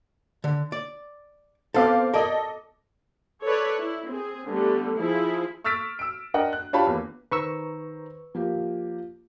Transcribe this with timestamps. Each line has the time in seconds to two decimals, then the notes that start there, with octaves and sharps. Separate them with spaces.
0.44 D3
0.72 D5
1.74 B3 C4 A4 F5 D6
2.14 A4 A#4 D5 D#5
3.43 A4 B4 C#5 D5
3.81 E4
4.10 C4 G#4
4.50 D3 G3 A3 B3
4.98 F3 E4 G#4
5.64 C#6 E6 F6 A6 B6 D7
5.99 E6 D7
6.34 D4 A#4 D#5 F#5 G5
6.53 F#6
6.73 D4 F4 G4 C#5 A5 B5
6.87 E2 A#3
7.31 D#3 B4 C5 A#5 C#6 E6
8.35 F3 A#3 G4